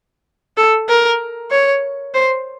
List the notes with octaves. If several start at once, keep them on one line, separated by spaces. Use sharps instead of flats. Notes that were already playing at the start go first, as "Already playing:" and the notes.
A4
A#4
C#5
C5